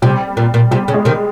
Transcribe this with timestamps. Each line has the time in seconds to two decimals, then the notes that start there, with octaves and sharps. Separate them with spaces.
0.02 C3 G3
0.37 A#2
0.54 A#2
0.71 C3 G3
0.88 C#3
0.94 G#3
1.05 C3 D#3